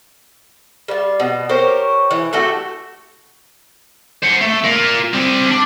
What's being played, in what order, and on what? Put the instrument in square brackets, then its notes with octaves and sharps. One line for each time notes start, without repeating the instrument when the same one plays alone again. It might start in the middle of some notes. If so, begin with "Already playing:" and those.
[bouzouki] G3 F4
B2
G4 A#4 C5 C#5
E3
A3 F#4 G4 A4
[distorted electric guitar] C5 F#5
A3
F4 A#4
G3 C4
D4